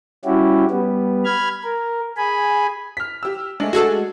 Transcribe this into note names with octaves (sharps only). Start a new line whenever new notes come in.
G3 C#4 E4 F#4 G4
G3 B3
B5 F6 G#6
A#4
G#4 G#5 B5
F6 B6
G4 E6
G#3 A3 D4
F#4 G#4 A4